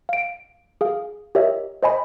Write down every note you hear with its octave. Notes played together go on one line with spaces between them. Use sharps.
F5 D7
G#4 F5
G4 A#4 C#5 D#5 E5
C5 D#5 G#5 B5